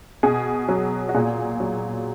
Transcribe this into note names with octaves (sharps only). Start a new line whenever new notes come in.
B2 G#4
F#3
F#4
A#2 G#4
F#3